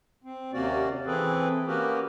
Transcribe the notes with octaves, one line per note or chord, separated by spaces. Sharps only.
C4
D#2 C3 A#3 C#4 F#4 D5
E3 C4 G#4 A4 B4
A#3 C#4 F#4 G4 A#4 B4